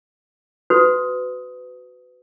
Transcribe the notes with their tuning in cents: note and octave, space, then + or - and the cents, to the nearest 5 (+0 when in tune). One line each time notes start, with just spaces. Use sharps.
F#4 +0 B4 +25 D#6 +10